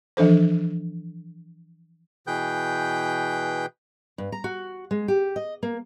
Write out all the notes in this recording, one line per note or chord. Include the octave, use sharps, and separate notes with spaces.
E3 F3 D4 A4 C5
B2 E3 G#4 B4 G5 G6
G2
A#5
F#4
G#3
G4
D#5
A#3